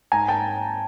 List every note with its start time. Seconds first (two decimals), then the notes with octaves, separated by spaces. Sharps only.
0.12 G#2 G#5 A#5
0.28 G5 A5